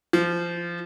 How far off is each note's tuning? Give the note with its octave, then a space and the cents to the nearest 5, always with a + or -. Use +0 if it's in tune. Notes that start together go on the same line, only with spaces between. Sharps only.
F3 -20